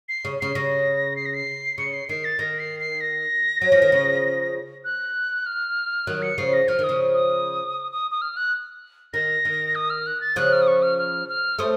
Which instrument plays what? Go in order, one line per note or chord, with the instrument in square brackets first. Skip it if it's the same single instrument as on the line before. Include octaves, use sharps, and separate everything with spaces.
[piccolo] C7
[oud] C#3
[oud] C#3 [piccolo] C7
[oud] C#3 [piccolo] A#6
[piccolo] C7
A#6
C7
[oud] C#3 [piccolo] C#7
[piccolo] C7
[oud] D#3 [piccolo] C7
[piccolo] A6
[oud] D#3 [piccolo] A#6
[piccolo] C7
C7
A#6
[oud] F#3
F3
D#3
C#3 F3
[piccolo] F#6
F6
[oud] D#3 F#3 [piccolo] F#6
[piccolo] C#7
[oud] C#3 F3 [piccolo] C7
[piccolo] A#6
[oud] F3 [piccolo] F6
[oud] D#3 [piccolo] D#6
[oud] C#3 F3
[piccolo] D#6
D#6
D#6
F6
F#6
[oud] D#3 [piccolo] A#6
[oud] D#3
[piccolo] D#6
F6
F#6
A6
[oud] C#3 F3 [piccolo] F#6
[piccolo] F6
D#6
C#6
F6
F6
F6
[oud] A3 C4 [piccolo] D#6